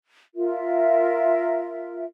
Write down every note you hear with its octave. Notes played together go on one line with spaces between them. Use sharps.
F4 A#4 E5